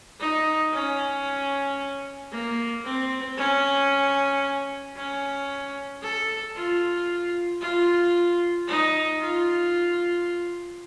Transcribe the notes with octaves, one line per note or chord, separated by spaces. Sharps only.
D#4
C#4
A#3
C4
C#4
C#4
A4
F4
F4
D#4
F4